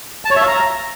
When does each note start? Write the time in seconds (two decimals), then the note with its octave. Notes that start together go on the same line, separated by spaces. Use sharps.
0.25 A5
0.30 C#5
0.36 E5
0.42 F5
0.48 A#5